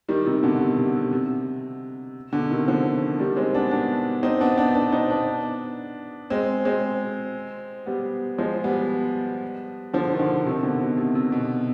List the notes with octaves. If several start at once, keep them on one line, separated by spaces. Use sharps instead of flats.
D#3 G3
C3 D#3
B2 D3
C3
C3
C3
C3
B2 D3
C3 D#3
D3 F3
D#3 G3
G#3 C4
B3 D4
B3 D4
C4 D#4
B3 D4
B3 D4
B3 D4
C4 D#4
B3 D4
G#3 C4
G#3 C4
G3 B3
F3 G#3
G3 B3
D3 F3
D#3
D3 F3
C3 D#3
B2 D3
B2
C3
C3
B2